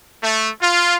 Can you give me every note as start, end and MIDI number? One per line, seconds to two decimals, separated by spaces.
0.23 0.49 57
0.62 0.97 65